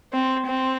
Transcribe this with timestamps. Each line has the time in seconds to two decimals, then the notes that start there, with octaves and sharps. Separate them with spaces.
0.13 C4
0.46 C4